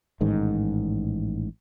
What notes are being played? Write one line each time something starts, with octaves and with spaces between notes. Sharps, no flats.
A1 G#2 D#3